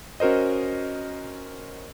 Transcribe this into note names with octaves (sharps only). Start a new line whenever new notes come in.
C#4 F#4 A#4 C5 D#5